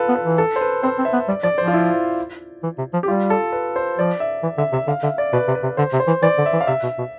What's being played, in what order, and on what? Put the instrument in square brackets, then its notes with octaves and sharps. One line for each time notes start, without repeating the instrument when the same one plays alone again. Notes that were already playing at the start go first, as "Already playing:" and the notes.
Already playing: [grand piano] F4 A4 B4
[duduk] B3
[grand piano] B4
[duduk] E3
[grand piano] A4
C5
B4
[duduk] C4 [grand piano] C5
[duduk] C4
[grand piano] E5
[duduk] B3
[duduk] G3 [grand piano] D5
[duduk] F3 [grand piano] D5
[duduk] F3 [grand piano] C5
[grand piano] F4
E4
[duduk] E3
C3
F3
[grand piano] G4
[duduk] G3 [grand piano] F4
[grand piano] A4
B4
C5
[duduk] F3 [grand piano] D5
[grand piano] E5
[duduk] E3
[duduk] D3 [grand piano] E5
[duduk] C3 [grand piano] E5
[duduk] D3 [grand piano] F5
[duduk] D3 [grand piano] E5
[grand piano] D5
[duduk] B2 [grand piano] B4
[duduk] C3
[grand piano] B4
[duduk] C3
[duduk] D3 [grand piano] C5
[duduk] C3
[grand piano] C5
[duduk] E3
[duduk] E3 [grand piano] D5
[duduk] D3
[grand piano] E5
[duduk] E3
[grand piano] F5
[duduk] C3 [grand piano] E5
[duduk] B2
B2